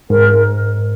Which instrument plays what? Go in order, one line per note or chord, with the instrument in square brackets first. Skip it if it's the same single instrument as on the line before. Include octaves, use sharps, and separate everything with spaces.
[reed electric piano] G#2 [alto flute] A#4